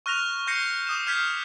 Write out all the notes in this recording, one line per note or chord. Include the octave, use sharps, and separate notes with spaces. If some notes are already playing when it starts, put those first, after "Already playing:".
C#6 F6 F#6 A#6 E7 F7
C#6 G6 A#6 C7 C#7
D6 D#6 E7
F6 G6 G#6 B6 C7